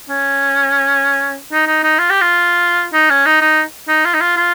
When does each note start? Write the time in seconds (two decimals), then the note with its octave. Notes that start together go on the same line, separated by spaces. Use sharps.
0.09 C#4
1.52 D#4
1.67 D#4
1.84 D#4
1.98 F4
2.10 G4
2.21 F4
2.93 D#4
3.10 C#4
3.26 D#4
3.41 D#4
3.88 D#4
4.05 F4
4.14 D#4
4.21 F4
4.36 F4